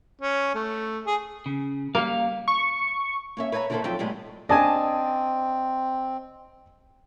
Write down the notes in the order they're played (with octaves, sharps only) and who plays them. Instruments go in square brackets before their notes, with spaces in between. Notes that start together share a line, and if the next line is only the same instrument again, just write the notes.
[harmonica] C#4
A3
G#4
[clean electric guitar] C#3
[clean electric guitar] G3 F5 [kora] A#3
[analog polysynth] C#6
[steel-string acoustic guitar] A#3 C#4 E5
B4 C#5 E5 G#5 A#5
D3 D#3 A#3 E4 A4 C5
F2 D3 F#3 D#4 A4 G5
A2 C3 G3 G#3 B3
[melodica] C4 [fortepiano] D4 G#5 [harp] D#5 A5